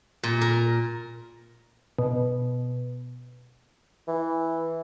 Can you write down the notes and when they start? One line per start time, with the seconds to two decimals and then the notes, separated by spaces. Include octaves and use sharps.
0.23 A#2
0.41 A#4
1.99 B2
4.08 E3